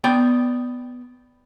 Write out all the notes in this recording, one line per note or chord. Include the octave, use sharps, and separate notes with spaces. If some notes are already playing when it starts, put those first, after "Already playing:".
B3 D5 G5